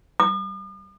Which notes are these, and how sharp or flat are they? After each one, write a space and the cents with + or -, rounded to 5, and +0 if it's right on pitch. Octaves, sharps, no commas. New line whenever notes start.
D#6 -45